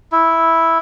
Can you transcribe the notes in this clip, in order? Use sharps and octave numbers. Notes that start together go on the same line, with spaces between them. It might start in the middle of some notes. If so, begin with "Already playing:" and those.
E4